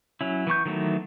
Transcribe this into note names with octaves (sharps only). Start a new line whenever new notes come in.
F#3 C#4 E4
E3 B3 C#6 G6
D#3 E3 F#3 A3 B3